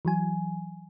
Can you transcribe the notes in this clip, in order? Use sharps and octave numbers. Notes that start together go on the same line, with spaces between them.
E3 F#3 G#5